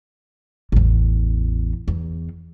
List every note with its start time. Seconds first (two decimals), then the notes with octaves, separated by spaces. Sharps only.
0.72 A1 E2
1.88 E2